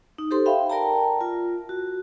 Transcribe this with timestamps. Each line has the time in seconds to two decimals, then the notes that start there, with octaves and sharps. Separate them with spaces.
0.18 D#4
0.31 G4 A4 C5 C6
0.46 E5 F5 G5 B5
0.70 A#4 D5 G5 A5 A#5
1.21 F4
1.69 F#4